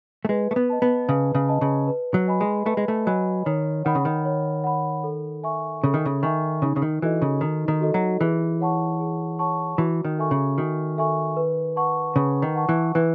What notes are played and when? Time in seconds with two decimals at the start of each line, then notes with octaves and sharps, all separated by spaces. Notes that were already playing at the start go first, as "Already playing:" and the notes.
0.25 A3
0.29 G#3 B4
0.51 A3
0.56 B3
0.70 D#5 A5
0.82 B3
1.09 C#3 B4
1.35 C#3
1.48 D#5 A5
1.61 C#3
1.88 B4
2.14 F#3
2.28 D#5 G#5 B5
2.41 G#3
2.66 A3 B4
2.77 G#3
2.88 A3
3.06 F#3 D#5 G#5 B5
3.45 D#3 C#5
3.85 D#3 F#5 B5
3.95 C#3
4.05 D#3
4.25 C#5
4.64 F#5 B5
5.04 A4
5.43 E5 G#5 C#6
5.83 C#3 A4
5.94 D#3
6.05 C#3
6.22 D#3 E5 G#5 C#6
6.62 C#3 D#4
6.76 C#3
6.82 D#3
7.02 E3 F#4 A4 D#5
7.22 C#3
7.41 D#3 D#4
7.68 D#3
7.81 F#4 A4 D#5
7.94 F#3
8.20 E3 G#4
8.61 C#5 F#5 A5 C#6
9.00 G#4
9.39 C#5 F#5 A5 C#6
9.78 E3 F#4
10.05 D#3
10.19 A4 E5 G#5 C#6
10.31 C#3
10.58 D#3 F#4
10.98 A4 E5 G#5 C#6
11.36 B4
11.76 F#5 A5 C#6
12.16 C#3 B4
12.42 D#3
12.56 F#5 A5 C#6
12.69 E3
12.95 E3 B4